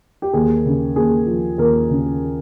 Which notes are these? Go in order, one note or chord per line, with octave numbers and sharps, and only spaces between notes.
G4
D#2 G#4
C#3
D#2 G#4
F3
D#2 A#4
C#3